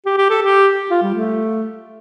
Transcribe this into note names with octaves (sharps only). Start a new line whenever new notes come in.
G4
G4
A4
G4
F4
G3
A3